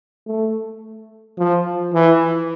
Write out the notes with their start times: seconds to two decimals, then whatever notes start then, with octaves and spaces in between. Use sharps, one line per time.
0.27 A3
1.38 F3
1.94 E3